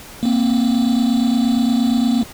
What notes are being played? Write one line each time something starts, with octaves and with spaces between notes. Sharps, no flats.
A#3 C4